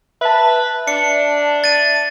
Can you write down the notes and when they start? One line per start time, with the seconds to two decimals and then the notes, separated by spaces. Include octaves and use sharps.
0.21 B4 E5 A5
0.88 D4 C#7
1.64 A6 D#7